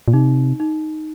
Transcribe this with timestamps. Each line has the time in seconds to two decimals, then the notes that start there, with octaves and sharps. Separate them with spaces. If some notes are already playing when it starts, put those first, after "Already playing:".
0.08 A#2
0.13 C3 D#4
0.60 D#4